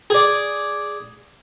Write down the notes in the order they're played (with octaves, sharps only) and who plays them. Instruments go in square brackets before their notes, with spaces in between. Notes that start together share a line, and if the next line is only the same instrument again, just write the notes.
[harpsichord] G#4 D5